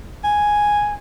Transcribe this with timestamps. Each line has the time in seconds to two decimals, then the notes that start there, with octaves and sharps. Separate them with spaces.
0.24 G#5